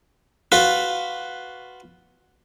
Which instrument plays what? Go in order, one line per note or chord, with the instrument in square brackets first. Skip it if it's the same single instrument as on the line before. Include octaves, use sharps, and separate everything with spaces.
[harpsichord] F4 F#4 B4